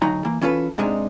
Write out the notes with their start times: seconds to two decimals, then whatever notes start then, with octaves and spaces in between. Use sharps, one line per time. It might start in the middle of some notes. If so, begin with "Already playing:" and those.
0.02 D2 F#3 D#4 A#5
0.25 E3 A#3
0.41 E3 C#4 F4 A4 B4
0.78 G#2 C3 G#3 D4 D#4